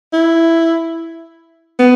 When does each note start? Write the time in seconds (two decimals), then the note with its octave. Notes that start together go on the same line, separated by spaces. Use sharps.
0.13 E4
1.79 B3